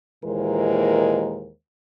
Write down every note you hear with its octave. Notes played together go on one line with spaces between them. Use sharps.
D#2 A#2 E3 G#3 A#4 C5